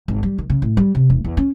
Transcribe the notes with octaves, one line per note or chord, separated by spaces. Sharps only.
G#1
G3
D#3
C#3
A2
G3
C3
E1
E2
C#4